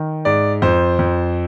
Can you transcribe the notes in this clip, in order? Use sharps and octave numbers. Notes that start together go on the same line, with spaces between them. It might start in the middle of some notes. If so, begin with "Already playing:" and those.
Already playing: D#3
G#2 D5
F2 C5
F2